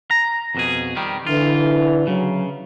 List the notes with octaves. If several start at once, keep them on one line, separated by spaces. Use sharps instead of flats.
A#5
F2 B2 G#4
D#3 G3
D3 E3 F4
C#3 F#3